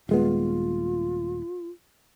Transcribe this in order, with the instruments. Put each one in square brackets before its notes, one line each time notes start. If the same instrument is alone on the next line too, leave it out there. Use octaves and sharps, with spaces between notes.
[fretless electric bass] D#1 G#3 B3 [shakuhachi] F4